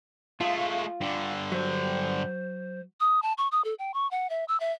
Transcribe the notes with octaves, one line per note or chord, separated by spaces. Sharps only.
G#3 A3 F4 F5
G2 D3 D5
F#3 C5
D#6
A5
C#6
D#6
A4
G5
C#6
F#5
E5
E6
E5